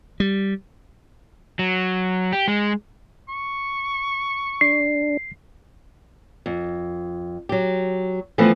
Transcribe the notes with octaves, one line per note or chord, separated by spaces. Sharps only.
G3
F#3
G4
G#3
C#6
D4 C7
F2
F#3 G4
E3 F3 A3 B3 C4 B4